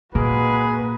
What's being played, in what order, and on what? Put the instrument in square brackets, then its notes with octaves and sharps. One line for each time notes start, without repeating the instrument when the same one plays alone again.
[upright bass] A#2 [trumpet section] G#3 G#4 [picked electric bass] A#3 [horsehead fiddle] F#4 B4